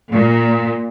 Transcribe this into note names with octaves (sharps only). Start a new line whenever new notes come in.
A#2